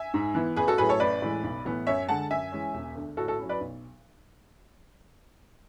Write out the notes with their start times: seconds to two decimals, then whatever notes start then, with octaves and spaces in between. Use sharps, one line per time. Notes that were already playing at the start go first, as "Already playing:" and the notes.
Already playing: E5 G#5
0.14 G#2
0.35 E3 B3 E4
0.56 A1 G#4 B4
0.67 F#4 A4
0.78 A2 F#3 A3 G#4 B4
0.89 A4 C#5
1.00 A1 B4 D5
1.22 A2 E3 G#3
1.43 B1
1.65 A2 E3 B3
1.87 F#2 C#5 E5
2.08 D3 G#3 F#5 A5
2.30 F#2 E5 G#5
2.52 E3 G#3 C#4
2.74 E1
2.96 D2 D3
3.17 A2 F#4 A4
3.28 F#4 A4
3.39 F#3 C#4 E4
3.49 B4 D5
3.61 B1